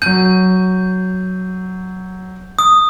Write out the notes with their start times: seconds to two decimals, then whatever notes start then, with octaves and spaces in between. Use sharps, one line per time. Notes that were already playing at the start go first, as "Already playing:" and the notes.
0.02 F#3 G6 D#7
2.59 D#6